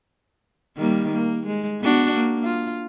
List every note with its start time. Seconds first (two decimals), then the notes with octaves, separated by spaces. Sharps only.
0.76 D#3 G3 A#3
1.13 A#3
1.47 G#3
1.80 B3 D4 F#4
2.14 A#3
2.44 F4